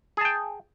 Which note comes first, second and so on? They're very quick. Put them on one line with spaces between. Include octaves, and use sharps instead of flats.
G#4 A5 G5